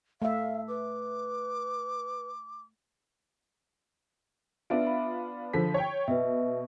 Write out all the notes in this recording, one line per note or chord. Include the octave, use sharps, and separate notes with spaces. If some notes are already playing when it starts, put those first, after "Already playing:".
A3 E5 F5
B4 D6
B3 D4 F4 E5 D7
B5
D3 F3 B6
C#5 G5
B2 B4 D#5 E5